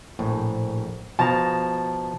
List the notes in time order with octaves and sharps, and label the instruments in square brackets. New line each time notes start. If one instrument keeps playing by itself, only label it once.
[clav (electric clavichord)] A#1 A2
[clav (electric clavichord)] B2 F3 [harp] A5 A#5